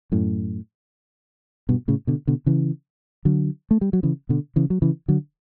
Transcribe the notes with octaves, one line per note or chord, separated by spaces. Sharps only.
F#2 A2
G2 B2
A2 C#3
B2 D3
B2 D3
C#3 E3
D3 F#3
A3
G3
F#3
C#3 E3
B2 D3
C#3 E3
F#3
C#3 E3
D3 F#3